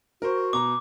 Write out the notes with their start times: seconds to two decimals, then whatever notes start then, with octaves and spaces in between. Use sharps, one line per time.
0.22 F#4 A#4 C5
0.53 B2 A#5 D6